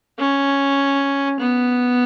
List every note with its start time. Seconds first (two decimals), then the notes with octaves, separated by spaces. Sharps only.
0.19 C#4
1.40 B3